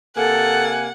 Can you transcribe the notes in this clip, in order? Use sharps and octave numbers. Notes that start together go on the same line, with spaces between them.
C3 A#3 A4 F#5 G#5